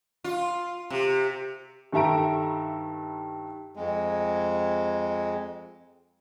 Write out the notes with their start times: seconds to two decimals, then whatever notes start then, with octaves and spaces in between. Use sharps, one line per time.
0.24 F4
0.90 C3
1.92 G2 D#3 A4 E5 A#5 D7
3.75 F2 G#3